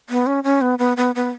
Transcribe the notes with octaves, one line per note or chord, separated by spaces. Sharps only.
B3
C#4
C#4
B3
B3
B3
B3